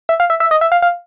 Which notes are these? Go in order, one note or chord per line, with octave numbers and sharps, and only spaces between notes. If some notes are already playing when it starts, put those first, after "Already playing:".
E5
F5
E5
E5
D#5
E5
F5
F5